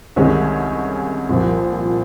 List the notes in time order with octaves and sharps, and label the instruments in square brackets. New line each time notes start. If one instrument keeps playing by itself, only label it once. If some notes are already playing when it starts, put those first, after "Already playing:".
[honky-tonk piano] C2 C3 D#3 G#3 C#4
C2 A#2 F3